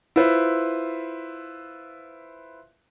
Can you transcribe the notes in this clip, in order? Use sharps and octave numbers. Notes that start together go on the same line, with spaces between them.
E4 F4 B4 C5